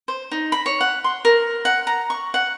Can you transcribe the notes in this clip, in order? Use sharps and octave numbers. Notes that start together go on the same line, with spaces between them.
C5
D#4
B5
C#5
F#5
C6
A#4
F#5
A#5
C#6
F#5